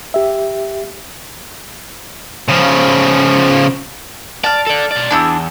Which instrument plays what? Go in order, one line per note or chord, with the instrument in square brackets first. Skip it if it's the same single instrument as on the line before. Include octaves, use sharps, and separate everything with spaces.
[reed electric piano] G4 E5
[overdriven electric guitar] C#3 F3
[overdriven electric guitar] D5 [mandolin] F5 A5
[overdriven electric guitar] A4 D5
B2 D5
[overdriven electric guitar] E2 [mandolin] D4 E4 E6